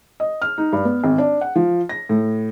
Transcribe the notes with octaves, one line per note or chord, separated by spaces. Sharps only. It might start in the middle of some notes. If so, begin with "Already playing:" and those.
D#5
F6
D#4
G2
B3
G#1
D4
F#5
F3
A#6
A2